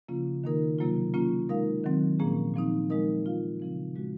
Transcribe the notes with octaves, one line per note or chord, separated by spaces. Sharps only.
C#3 F3 A#3 C#4 F4
D#3 A#3 D#4 A#4
C3 F#3 A#3 F4
F#3 A#3 C#4 F4
G#3 D#4 A#4 F5
D#3 F#3 C4
A#2 F3 A#3 C#4 G#4
A#2 F3 C4 D#4
F3 G#3 D#4 A#4 D#5
C4 F4 A#4 F5
C#3 F3 C4
A#2 G#3 C#4 F#4